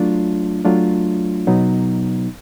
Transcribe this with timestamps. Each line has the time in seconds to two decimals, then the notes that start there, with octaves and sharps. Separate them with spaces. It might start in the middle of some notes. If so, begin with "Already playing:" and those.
Already playing: F#3 A3 D4 F4
0.65 F#3 A3 D4 F4
1.47 B2 F#3 B3 D#4